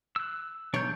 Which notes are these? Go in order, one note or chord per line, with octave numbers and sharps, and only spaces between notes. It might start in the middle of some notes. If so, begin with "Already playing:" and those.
E6 F#6
B1 E2 D4 C#5 G6